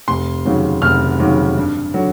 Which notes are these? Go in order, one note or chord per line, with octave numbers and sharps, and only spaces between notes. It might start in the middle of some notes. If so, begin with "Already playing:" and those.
F1 C6
D#2 C#3 F#3
F1 F6
D#2 C#3 F#3
G2
D3 F#3